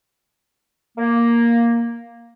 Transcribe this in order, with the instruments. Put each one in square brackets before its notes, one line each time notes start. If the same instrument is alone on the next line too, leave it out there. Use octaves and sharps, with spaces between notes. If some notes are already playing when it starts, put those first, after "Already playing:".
[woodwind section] A#3